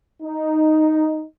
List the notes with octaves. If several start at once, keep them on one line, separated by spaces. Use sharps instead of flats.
D#4